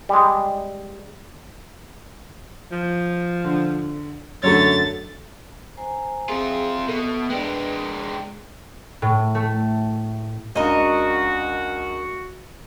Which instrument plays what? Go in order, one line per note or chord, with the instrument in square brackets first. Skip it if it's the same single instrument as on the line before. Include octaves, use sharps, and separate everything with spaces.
[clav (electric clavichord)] G3 G#3
[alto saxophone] F3
[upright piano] D3
[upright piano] F#2 D3 A3 [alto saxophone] C#5 [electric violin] A6
[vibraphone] C5 G#5 A#5
[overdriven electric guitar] C4 F4 [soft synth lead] G#4 [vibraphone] E5
[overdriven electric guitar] B2 [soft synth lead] A4
[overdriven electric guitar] G#3 D4 [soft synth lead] B4 [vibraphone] G5
[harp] A2
A3
[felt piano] C#2 D4 [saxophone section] F#4 [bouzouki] A#4 D#5